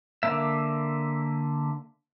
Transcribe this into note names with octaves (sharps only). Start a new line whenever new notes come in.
D3 A#3 E5